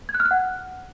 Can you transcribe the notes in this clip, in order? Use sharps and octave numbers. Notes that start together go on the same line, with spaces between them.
G#6
F#6
F6
F#6
F#5